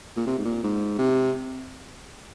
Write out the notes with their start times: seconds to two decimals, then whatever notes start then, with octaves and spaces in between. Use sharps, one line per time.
0.17 A#2
0.27 C3
0.38 G#2
0.45 A#2
0.63 G#2
0.99 C3